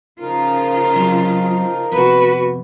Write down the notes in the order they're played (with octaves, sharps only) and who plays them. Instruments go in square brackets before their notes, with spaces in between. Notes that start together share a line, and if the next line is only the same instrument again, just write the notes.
[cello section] C#3 F4 [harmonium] F3 D#4 A#4
[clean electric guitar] F#3 C4 G#4
[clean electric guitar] F2 C3 B3 [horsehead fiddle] F#4 B4